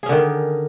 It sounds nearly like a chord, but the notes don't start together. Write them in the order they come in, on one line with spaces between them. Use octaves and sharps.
G#4 C#4 D3 D#3